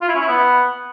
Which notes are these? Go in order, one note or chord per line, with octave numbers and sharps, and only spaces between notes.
F4
E4
C#4
E4
B3